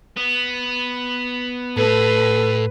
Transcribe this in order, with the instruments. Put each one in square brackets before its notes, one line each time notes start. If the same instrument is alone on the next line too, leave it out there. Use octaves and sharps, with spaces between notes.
[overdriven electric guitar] B3
[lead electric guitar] A2 [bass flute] A4 [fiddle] B4